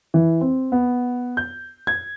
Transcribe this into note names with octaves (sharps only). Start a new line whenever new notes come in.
E3
C4
B3
G6
G#6